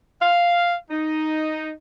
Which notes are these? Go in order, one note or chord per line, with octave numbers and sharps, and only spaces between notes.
F5
D#4